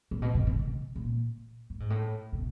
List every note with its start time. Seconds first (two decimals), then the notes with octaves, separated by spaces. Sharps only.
0.11 A#2
0.22 B2
0.35 C3
0.47 C3
0.59 B2
0.96 A#2
1.70 A2
1.80 G#2
1.90 A2
2.33 B2